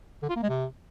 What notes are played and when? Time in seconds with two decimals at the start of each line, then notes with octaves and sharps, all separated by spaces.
0.22 D3
0.29 F4
0.36 A#3
0.43 G#3
0.49 C3